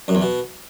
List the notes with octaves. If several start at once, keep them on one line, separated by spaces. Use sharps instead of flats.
F#2
E2
B2